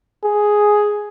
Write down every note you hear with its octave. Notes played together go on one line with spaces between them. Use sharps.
G#4